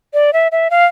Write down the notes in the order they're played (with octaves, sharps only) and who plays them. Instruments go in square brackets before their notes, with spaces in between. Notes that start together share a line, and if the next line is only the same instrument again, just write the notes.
[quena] D5
E5
E5
F5